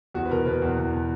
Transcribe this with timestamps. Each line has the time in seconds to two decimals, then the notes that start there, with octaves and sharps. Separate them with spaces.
0.14 E2 F#4
0.25 B4
0.31 B2 A#4
0.46 B2 B4
0.62 E2
0.78 E2
0.93 B2